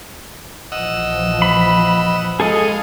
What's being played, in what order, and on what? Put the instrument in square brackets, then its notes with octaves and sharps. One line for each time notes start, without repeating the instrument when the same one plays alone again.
[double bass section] A#1 E3 F3 [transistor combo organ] D#5 F#5 E6
[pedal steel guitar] B5
[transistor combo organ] G#3 F4 [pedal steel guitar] G#4 A4 D#5